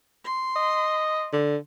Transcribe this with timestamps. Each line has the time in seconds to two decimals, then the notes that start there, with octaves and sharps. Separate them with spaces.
0.24 C6
0.56 D#5
1.32 D3